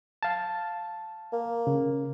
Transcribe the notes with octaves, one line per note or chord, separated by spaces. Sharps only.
F5 A5
A#3
C#3